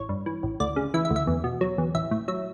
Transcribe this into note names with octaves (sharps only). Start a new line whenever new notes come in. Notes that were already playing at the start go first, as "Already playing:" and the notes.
Already playing: A1 C#5
G2
E3
A1
D2 D5
C#3
E3 E5
E5
D2
E5
E2
B2
F#3
E2
A1 E5
A2
F#3 E5